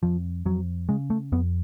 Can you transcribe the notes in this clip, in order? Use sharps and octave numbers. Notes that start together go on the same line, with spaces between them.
F2 F3
F2 F#3
C#3 G#3
A3
F2 B3